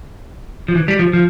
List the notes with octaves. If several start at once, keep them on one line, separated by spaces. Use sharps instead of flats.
F3
E3
G3
F3
F3